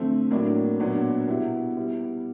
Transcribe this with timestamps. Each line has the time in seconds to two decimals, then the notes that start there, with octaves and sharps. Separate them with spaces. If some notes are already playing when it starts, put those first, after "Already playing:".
Already playing: D3 F3 A3 C4
0.31 A2 F#3 A#3 D4
0.80 A#2 F#3 B3 D4
1.28 B2 G3 B3 E4 G4
1.76 G3 B3 E4